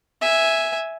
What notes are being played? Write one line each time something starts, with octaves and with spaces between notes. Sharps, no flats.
E5 G#5